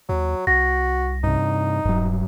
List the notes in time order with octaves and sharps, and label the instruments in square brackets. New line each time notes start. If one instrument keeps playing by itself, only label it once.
[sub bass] D#2 [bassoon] F#3
[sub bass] C2 [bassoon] F#4 [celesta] A#6
[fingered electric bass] G2 C3 [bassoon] D#4
[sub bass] D#1 [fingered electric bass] G2 F#3